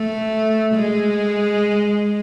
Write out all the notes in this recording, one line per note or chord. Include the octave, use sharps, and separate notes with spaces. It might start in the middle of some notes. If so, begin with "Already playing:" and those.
Already playing: A3
G#3